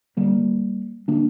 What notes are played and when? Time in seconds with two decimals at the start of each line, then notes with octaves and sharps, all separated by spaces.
0.17 D2 D3 G3 A#3
1.08 D3 A#3 D4